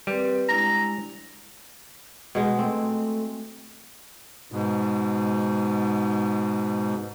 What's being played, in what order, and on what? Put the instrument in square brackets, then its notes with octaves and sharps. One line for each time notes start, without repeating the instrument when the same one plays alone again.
[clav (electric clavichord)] G3 [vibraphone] C4 A#4 B4
[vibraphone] G#3 D4 E4 [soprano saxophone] A#5
[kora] B2 G#3
[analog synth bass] A3 [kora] C4
[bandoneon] G#2 B2